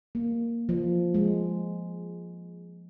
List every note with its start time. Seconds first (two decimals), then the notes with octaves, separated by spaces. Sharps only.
0.15 A#3
0.69 F3
1.14 G#3